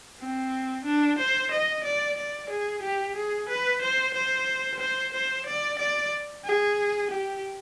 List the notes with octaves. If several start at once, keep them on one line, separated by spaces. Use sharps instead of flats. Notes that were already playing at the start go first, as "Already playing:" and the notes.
C4
D4
C5
D#5
D5
D5
G#4
G4
G#4
B4
C5
C5
C5
C5
D5
D5
G#4
G4